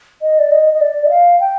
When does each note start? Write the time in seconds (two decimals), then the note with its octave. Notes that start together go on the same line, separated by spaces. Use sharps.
0.22 D#5
0.39 D5
0.51 D#5
0.73 D#5
0.80 D5
1.05 D#5
1.10 F5
1.40 G5